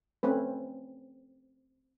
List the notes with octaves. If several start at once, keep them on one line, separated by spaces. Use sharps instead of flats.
A3 C4 C#4 B4